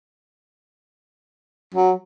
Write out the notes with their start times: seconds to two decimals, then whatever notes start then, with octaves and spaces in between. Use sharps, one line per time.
1.74 F#3